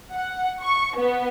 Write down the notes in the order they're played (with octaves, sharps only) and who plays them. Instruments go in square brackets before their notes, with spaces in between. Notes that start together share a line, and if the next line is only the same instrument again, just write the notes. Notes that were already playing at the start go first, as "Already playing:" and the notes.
[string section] F#5
C#6
B3